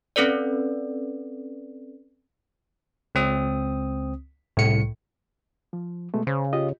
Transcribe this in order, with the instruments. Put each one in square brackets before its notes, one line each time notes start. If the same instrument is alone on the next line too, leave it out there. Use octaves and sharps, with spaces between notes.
[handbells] C4 C#4 A4 B4 D5
[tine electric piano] C#2 C4 D#6
[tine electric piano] C2 C#7 [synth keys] A2
[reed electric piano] F3
B2 G#3 A3
[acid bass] C#3 [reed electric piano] C5
[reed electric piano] F4 G4 D#5